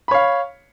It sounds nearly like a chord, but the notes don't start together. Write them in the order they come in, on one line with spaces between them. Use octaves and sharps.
B5 C#5 F5